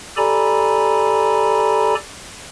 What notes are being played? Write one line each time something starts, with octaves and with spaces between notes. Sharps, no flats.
G4 A4 D5 G#5 A#5 B5